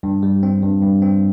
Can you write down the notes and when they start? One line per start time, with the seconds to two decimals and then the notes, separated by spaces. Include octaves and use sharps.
0.03 G2
0.23 G3
0.43 C4
0.63 G2
0.82 G2
1.02 C4